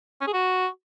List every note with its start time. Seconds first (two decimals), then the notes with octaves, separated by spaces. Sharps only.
0.21 C#4
0.27 G#4
0.33 F#4